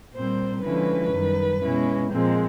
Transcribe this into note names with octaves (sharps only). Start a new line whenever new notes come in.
A#2 G3 C4 C5
D3 F3 G#3 C#4 E4 B4
F#2 D#3 G3
B2 G#3 C#4 E4
A#2 F3 G#3 C4